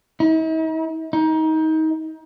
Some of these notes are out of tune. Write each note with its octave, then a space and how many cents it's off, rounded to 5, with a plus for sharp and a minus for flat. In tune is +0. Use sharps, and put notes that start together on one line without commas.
D#4 +45
D#4 +25